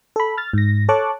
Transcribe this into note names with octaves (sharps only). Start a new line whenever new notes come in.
A4 B5
F6 A6
G#2 A#6
A4 C#5 A5 C#6 D6 F#6